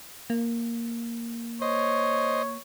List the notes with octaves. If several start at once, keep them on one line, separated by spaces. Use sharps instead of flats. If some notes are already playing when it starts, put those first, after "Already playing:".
A#3
C5 C#5 D#5